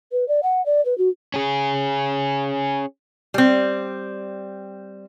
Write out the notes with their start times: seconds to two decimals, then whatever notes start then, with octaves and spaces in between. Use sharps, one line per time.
0.12 B4
0.28 D5
0.43 F#5
0.66 D5
0.85 B4
0.98 F#4
1.34 C#4 G#4
3.34 G3 C4